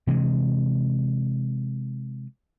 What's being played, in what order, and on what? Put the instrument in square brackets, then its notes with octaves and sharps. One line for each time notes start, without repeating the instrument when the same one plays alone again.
[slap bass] C3 E3 G#3